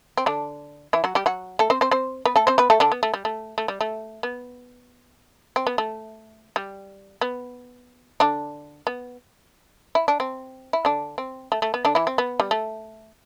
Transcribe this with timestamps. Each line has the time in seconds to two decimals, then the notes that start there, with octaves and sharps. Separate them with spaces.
0.17 C4
0.26 D3 D4
0.93 E3 E4
1.04 F#3 F#4
1.15 G3 G4
1.26 F#3 F#4
1.59 A3 A4
1.70 C4 C5
1.81 C4 C5
1.91 C4 C5
2.25 B3 B4
2.36 A3 A4
2.47 C4 C5
2.58 B3 B4
2.70 A3 A4
2.80 D3 D4
2.92 B3
3.03 A3
3.14 G3
3.25 A3
3.58 A3
3.68 G3
3.81 A3
4.23 B3
5.56 C4
5.67 B3
5.78 A3
6.56 G3
7.21 B3
8.20 D3 D4
8.87 B3
9.95 E4
10.08 D4
10.20 C4
10.73 E4
10.85 D3 D4
11.18 C4
11.52 A3
11.62 A3
11.74 B3
11.85 D3 D4
11.95 E3 E4
12.07 C4
12.18 B3
12.40 G3
12.51 A3